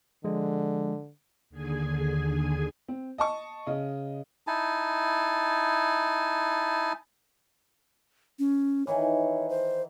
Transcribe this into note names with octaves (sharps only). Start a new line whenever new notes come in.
D3 F3 G#3
D#2 D3 G#4 G#5
C4
D#5 A5 C#6
C#3 D#5
D#4 E4 G#5 A5
C#4
D#3 E3 C#5
C5